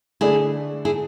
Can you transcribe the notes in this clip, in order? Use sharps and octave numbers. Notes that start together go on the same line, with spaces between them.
D3 A3 D4 E4 G#4
E4 G#4